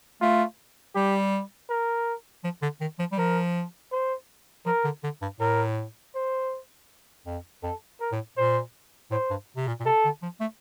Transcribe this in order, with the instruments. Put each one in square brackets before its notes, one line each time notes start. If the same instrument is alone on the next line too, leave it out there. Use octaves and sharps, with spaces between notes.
[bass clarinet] A3 [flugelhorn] F4
[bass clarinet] G3 [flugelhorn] G4
[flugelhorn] A#4
[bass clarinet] F3
D3
D#3
F3
G3
[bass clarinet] F3 [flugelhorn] A#4
[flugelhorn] C5
[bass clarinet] F3 [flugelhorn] A#4
[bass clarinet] D3
D3
G2
[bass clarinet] A2 [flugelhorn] A#4
[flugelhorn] C5
[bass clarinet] F2
[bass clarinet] F2 [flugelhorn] A4
[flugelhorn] A#4
[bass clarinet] A2
[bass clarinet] A#2 [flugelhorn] C5
[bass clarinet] A2 [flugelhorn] C5
[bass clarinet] G2
C3
A#2
A#2
[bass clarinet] C3 [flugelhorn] A4
[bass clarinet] D3
F3
A3